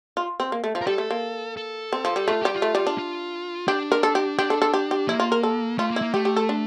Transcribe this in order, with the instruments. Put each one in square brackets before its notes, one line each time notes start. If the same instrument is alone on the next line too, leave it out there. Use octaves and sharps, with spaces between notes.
[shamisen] F4
C4
A#3
A3
F3
[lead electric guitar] A#4
[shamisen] G3 [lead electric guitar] A4
[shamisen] A3
A#3
[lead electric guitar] A4
[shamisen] C4
F3
G3
[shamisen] A3 [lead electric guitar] F4
[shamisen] G3 [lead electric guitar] G4
[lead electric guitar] F4
[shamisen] A3
G3
D4
[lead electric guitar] F4
[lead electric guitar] D4 [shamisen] G4
[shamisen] A#4
A4
G4
[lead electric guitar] D4 [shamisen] G4
[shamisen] A4
A4
G4
G4
[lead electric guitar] A#3 [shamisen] E4
[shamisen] F4
A#4
A4
[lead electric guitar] A3 [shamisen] F4
[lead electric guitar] A#3
[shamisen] E4
[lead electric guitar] A#3
[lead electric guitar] A3 [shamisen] G4
[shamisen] G4
A4
D4